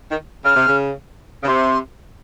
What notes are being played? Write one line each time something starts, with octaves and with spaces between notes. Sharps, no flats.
D#3
C#3 F6
C3
C#3
C#3
C3 C6